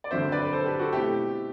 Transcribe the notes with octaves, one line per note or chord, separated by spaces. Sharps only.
D5
G2 D3 F#3 C4 C5 E5
B4 D5
B4
A4 C5
G4 B4
F#4 A4
B2 A3 C4 E4 G4